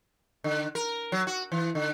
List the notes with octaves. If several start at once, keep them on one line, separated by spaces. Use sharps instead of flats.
D3
A#4
F#3
F#4
E3
D3